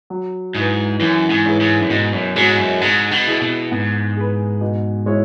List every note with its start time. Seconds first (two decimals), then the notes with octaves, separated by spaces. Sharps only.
0.10 F#3
0.55 G#2 E4 B4
1.00 F#2 E3
1.30 G#2
1.45 C#4 E4 G#4 B4
1.61 G#2
1.80 F#2
1.90 G#2 B2
2.13 F#2
2.35 G#2 G#3 C#4 F#4
2.58 F#2
2.81 G#2 G#3
3.11 B2
3.27 E4 G#4
3.41 B2
3.71 G#2 B3
4.16 G#4 B4
4.61 B2
5.06 G#3 E4 C#5